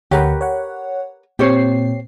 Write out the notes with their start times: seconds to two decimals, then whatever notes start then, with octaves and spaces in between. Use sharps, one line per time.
0.11 D2 G4 A#4 B4 C#5 F#5
0.41 C#5 F#5
1.39 A#2 C4 G4 C5 C#5 C7